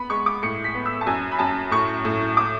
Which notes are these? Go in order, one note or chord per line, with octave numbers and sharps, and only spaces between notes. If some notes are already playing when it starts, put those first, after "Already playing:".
Already playing: B3 B5
G#3 C#6
D6
A2 C#7
B6
B3
E6
A5
F#2 G#5
B5
F#2 A5
A2 C#6
A2
D6